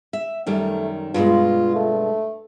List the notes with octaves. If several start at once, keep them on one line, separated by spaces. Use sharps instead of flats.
E5
F#2 D#3 G3 A3
G2 B2 G#3 F4
A3